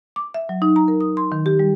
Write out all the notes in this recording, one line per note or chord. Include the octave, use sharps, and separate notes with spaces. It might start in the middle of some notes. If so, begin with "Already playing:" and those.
D6
E5
F#3
D#4
A#5
A#4
D#6
C6
D#3
G4
G3